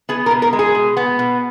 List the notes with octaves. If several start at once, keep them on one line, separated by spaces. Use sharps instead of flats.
B3 G#4
A#4
B2
A#4
G#3
G#4
B2
B3
B2